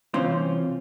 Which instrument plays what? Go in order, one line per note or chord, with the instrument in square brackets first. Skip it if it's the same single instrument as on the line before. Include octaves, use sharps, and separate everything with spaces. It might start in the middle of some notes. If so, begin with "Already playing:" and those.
[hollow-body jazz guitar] C2 E3 C4 C#4 F4 C5